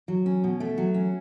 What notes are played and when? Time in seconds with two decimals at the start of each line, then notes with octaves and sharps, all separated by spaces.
0.08 F#3
0.26 C#4
0.44 B2
0.60 A3
0.78 F#3
0.94 C#4